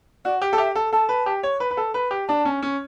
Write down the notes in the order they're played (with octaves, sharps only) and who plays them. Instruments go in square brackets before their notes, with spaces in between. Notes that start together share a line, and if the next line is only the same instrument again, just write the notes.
[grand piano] F#4 [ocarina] D5
[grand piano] G4
A4
[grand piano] G4 [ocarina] E5
[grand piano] A4
[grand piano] A4 [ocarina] A5
[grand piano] B4
G4
C#5
B4
B4
A4
B4
G4
[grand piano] D4 [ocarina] A5
[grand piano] C#4
C#4